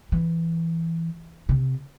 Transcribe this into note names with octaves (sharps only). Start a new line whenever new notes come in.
E3
C3